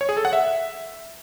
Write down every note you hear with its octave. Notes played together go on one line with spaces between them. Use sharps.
C#5
G#4
A4
F#5
E5